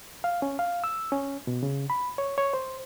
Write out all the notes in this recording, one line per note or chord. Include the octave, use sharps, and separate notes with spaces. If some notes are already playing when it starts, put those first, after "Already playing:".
F5
C#4
F5
E6
C#4
B2
C#3
B5
C#5
C#5
C5